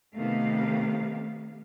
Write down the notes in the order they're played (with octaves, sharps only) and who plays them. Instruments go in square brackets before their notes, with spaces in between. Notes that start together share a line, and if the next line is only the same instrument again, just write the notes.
[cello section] C3 D#3 A3 B3 F5